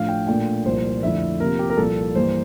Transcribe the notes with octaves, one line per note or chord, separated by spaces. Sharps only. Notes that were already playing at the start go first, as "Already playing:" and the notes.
Already playing: A2 F3 A3 D4 F5
G5
A#2 A3 D4 G5
C2 A#2 F3 C5
F2 D3 A3 E4 E5
C3 F3 A#3 A#4
G4
A#4
C2 A#2 F3 A4
G2 E3 A#3 C5